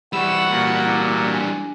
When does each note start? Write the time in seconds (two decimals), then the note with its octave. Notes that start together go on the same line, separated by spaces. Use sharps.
0.13 E3 G3 F#5 B5 C#6 E6
0.50 A#2 F#4
0.85 A#5 D6 E6
1.25 D4 G#5